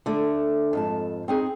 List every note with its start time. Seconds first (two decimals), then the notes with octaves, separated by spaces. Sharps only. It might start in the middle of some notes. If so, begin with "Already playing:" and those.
0.06 D3 A3
0.73 F2 G#2 A5
1.28 C4 D#4 G#4